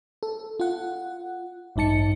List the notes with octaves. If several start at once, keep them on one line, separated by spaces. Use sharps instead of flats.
A4
F4 F#5
A1 G2 D#4 A5 C#7